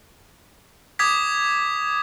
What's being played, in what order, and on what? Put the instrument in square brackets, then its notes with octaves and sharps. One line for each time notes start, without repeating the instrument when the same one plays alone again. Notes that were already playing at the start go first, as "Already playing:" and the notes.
[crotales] D6 D#6 G#6 B6